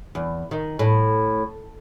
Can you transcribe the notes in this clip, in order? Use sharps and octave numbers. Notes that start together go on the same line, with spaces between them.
E2
D#3
A2